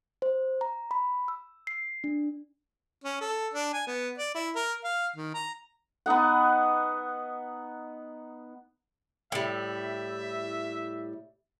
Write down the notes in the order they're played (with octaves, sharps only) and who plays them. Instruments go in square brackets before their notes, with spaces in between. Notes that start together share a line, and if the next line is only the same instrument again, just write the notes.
[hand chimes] C5
A#5
B5
E6
C7
D4
[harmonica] C#4
A4
D4
G#5
B3
D5
E4
A#4
F5
D#3
A#5
[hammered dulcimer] B3 D#4 D#5 F#5
[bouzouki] A2 G3 [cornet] E5